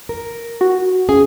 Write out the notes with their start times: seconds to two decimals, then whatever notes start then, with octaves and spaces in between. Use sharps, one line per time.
0.09 A#4
0.61 F#4
1.09 C#3 G#4 G#5